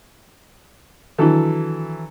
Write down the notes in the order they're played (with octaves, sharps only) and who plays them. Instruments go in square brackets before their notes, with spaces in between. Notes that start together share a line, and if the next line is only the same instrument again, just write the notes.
[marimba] D#3 D4 E4 [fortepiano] E3 F#3 A4